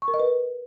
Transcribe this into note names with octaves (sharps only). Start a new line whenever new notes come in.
C#6
A#4
D#5
B4